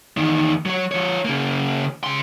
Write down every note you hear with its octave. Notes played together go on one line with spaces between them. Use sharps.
E2 D#3
F#3 C#5
F3 C#5
C#3 A#3
C#3 C6